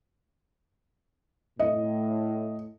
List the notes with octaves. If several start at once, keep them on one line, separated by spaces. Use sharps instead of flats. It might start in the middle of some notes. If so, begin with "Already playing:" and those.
A2 D#5